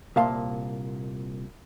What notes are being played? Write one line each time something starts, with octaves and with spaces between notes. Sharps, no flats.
C2 A#2 E5 F5 A5 C6